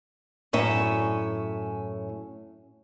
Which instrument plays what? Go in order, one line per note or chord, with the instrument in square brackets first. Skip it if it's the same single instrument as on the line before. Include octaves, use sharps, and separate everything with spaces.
[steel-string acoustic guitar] F#2 A2 C#4 E5